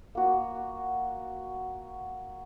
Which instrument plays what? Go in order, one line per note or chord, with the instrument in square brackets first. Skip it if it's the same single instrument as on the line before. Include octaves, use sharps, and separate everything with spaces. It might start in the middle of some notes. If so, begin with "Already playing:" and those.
[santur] A#3 F#4